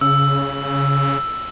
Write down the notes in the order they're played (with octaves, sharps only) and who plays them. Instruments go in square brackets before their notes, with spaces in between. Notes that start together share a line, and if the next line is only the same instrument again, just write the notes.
[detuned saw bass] C#3 [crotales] E6